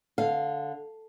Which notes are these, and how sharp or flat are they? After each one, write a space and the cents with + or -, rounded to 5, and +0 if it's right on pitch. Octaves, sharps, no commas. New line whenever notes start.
D3 +0 F5 +0